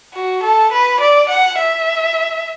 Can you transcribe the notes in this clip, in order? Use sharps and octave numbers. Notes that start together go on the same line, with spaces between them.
F#4
A4
B4
D5
F#5
E5